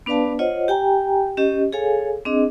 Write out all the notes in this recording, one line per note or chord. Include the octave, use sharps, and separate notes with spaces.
B3 D4 B4 D5 F5 A5
F4 C5 C#5 D#5 F#5
G4 G5 G#5 A#5
C#4 G4 D#5
G#4 A4 C#5 F5 G#5
C4 D4 G#4 D#5